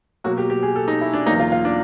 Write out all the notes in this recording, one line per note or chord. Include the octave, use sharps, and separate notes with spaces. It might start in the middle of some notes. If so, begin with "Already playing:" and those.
B2 F#3 A#3 F#4
G4
G4
G#4
A4
D#4
E4
D4
E2 B2 F#3 A#3 D#4
F4
F4
D4